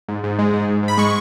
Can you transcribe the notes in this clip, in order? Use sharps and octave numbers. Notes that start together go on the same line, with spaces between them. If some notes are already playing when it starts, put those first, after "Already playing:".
G#2
G#2
G#3
G#2
G#2
G#2
B5
G#3 C#6